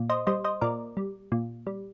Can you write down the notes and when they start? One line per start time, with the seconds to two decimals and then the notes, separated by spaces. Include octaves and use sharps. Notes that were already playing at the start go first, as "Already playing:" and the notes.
Already playing: A#2
0.09 C5 D#5
0.27 G3 C5 D#5
0.44 C5 D#5
0.61 A#2 A#4 D5
0.97 G3
1.32 A#2
1.67 G3